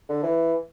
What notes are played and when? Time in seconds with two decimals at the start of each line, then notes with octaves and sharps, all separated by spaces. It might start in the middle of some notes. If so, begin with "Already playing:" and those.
0.09 D3
0.23 E3